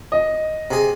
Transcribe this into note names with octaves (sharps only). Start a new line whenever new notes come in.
D#5
C3 G#4